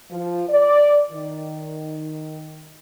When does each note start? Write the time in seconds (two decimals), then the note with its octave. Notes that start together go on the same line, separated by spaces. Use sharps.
0.10 F3
0.49 D5
1.12 D#3